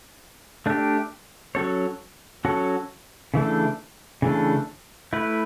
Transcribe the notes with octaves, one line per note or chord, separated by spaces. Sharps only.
A3 D4 G4
F#3 C#4 F#4 A4 C#5
F#3 C#4 F#4 A4 C#5
C#3 E3 A3 D4
C#3 E3 A3 D4
A3 E4 B4